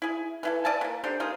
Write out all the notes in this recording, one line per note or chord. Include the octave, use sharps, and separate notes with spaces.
E4 G#4
E3 E4 A4
D5 E5 G#5 A5
A#3 B3
D4 G4 A4 C5
A#3 D#4 F4 G#4